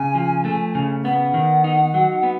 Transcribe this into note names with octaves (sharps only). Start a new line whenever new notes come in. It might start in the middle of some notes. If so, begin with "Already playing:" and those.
Already playing: C#3 G#5
F3
A3
C#3
B3 F#5
D#3
D#4
F#3
B3